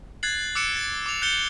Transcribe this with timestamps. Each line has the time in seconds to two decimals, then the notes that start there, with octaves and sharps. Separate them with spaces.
0.23 F#6 G#6 A6 C7 F#7
0.55 D6 E6 F#6 C#7 D7 E7
0.76 A6
1.06 D6 F7
1.22 F#6 G6 A6 C#7 G7